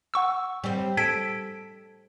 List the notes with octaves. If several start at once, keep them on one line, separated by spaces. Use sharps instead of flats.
F#5 C#6 E6
G3 C4
A4 G#6 B6 D7